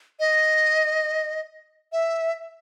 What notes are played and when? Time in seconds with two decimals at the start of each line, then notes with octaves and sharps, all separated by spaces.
0.20 D#5
1.92 E5